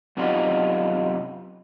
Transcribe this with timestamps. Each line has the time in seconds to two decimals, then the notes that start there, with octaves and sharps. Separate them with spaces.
0.17 F#2 C3 G3 B3 D#4 F4